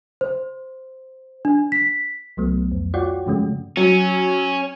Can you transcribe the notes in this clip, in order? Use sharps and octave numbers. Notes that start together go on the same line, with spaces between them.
C5
D4
B6
C2 F#3 A3 B3
F2
F4 F#4 C#5 D5 F#5 G5
G2 C#3 F3 G#3 A3 C#4
F#3 C#4